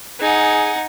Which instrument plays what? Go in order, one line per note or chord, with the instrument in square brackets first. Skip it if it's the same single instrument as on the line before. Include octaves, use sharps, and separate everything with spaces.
[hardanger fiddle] D#4 [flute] G#4 [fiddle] F#5 G#5